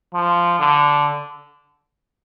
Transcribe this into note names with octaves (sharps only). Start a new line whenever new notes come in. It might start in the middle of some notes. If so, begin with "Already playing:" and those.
F3
D3